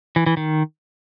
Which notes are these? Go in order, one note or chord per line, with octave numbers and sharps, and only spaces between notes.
E3
E3
D#3